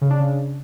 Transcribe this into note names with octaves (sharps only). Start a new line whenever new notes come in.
C#3
D4
C#3